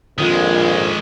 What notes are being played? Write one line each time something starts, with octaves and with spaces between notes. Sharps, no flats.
A#1 F2 D#3 G#3 F4